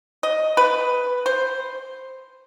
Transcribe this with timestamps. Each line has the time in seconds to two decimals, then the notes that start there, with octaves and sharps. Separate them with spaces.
0.23 D#5
0.57 B4
1.26 C5